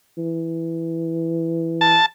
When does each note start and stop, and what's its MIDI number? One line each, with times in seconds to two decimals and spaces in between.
0.18 1.97 52
1.81 2.06 81